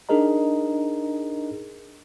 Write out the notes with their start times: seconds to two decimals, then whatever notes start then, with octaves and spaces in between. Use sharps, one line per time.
0.09 D4 D#4 G#4 A#4 D#5 A#5